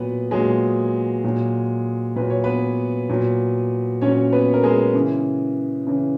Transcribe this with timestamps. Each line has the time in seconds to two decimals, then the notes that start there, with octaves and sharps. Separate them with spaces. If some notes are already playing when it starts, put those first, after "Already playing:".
Already playing: A#2 F#3 B3 B4
0.31 A#2 F#3 G#3 G#4
1.24 A#2 F#3
2.16 A#2 F#3 B4
2.30 C#5
2.44 B3 B4
3.09 A#2 F#3
4.01 A#2 F#3 C#4 C#5
4.33 B3 B4
4.54 A#4
4.64 G#3 G#4
4.94 C#3 E3
5.87 C#3 E3